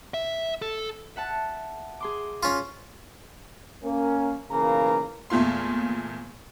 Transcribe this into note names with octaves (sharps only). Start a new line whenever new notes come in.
E5
A4
E5 F#5 A5
G#4 C6 D6
C#4 F4
A#3 C#4 A#4
B1 C#3 E3 A#3 A#4 A#5
E2 A#2 A3 F4 C6